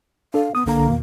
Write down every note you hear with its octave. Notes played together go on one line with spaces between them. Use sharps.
D4 A4 F5
B3 D#6
B1 D3 A#3 A#5
E2 B2 D#3